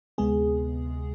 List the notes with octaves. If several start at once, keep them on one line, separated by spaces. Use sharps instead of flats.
D2 C3 G#3 B3 G#4